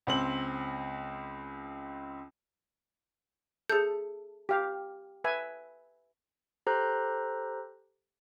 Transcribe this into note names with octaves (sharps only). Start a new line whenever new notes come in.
C#2 C4 F#7
G#4 A4 G6
G4 F5
B4 E5 G#5
G4 A4 C5 A#5 F#6 G6